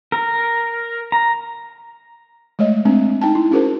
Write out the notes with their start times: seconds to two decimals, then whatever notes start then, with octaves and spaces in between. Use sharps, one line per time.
0.12 A#4
1.12 A#5
2.59 G#3 A3 C#5 D#5
2.85 G#3 A3 C4 D4
3.21 D#4 G5 A5
3.35 E4
3.51 C#4 F#4 G#4 A#4 C5